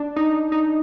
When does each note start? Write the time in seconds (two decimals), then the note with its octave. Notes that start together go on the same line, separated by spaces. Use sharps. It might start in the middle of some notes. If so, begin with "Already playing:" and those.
Already playing: D4
0.16 D#4
0.52 D#4